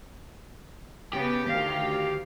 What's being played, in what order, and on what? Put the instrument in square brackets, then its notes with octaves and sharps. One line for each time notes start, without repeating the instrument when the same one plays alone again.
[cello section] C#3 B3 [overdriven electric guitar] G4
[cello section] D2 D#3 F5